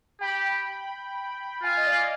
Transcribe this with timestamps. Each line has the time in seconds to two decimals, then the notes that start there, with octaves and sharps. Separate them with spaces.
0.21 G4 G5 B5
1.63 F4 F5 G#5
1.77 D#5
1.86 D5 F5